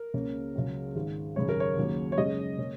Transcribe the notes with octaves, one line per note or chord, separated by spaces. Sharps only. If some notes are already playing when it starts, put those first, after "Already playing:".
Already playing: A#4
C#2 C#3 A#3 C#4
C#2 C#3 F#3 C#4
G#1 G#2 G#3
G#1 F#2 C#3 C#5
A#4
C#5
D#2 C#3 F#3 A#3
C#5
F#2 C#3 G#3 C#4 D#5
C#3 A#3 C#4